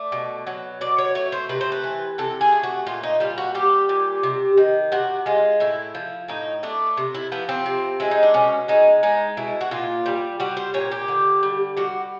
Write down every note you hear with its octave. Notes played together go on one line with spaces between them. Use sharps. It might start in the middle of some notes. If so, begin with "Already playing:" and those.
Already playing: A3 D5
B2
F#3
B2 D5
C#5
A3 C#5
C5
C3 B4
C5
B4
E3
C3 A4
G#4
A3
F#4
A#2 F4
D#4
G3 F4
F#4
G3 G4
A#2
C3
D#3
C3 F#4
G#3 F4
A2 E4
F3
A2 D#4
A3 D4
C3
E4
F3 B3
C4
C3
G#3 E4
D#4
D4
B2 C#4
G#3 D#4
G#3 D#4
B2 E4
F#4
A#2 F4
G3
G3 F#4
C5
A#2 C#5
G4
D3
G3
G3 F#4